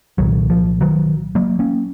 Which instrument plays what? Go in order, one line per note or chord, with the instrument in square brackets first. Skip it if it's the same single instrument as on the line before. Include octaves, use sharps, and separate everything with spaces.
[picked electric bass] C2 A#2 D#3 F#3
F3
D#3 F#3
F#3 A#3
A#3 C#4